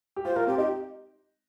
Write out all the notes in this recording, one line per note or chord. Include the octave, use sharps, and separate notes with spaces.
G4
F4 C5
F4 A#4
C4 G4
D#4 G4